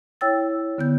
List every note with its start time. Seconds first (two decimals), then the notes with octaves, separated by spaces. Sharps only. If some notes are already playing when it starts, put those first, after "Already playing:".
0.21 E4 C#5 G5 E6 A6
0.78 D3 B3 G6